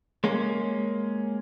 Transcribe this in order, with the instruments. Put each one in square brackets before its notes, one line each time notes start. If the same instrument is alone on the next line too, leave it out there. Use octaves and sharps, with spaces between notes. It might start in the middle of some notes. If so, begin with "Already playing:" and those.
[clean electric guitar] G#3 A#3 C#4